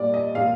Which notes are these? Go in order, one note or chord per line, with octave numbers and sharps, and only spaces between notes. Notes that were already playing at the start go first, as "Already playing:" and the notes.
Already playing: A#2 G3 D5
D#5
A#2 G#3 F5